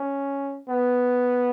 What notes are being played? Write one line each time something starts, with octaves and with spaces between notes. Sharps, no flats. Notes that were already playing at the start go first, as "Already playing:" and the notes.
Already playing: C#4
B3